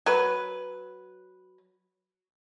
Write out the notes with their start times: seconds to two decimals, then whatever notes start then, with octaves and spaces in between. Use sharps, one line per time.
0.06 F#3 B4